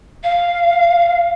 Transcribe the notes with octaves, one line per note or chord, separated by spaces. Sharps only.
F5